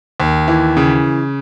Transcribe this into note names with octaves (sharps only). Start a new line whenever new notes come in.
D#2
E3
C#3